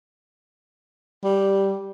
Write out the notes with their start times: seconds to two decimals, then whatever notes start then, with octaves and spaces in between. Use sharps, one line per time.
1.24 G3